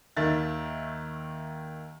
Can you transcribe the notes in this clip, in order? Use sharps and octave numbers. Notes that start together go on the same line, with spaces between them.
D#2 D#3 E5 A6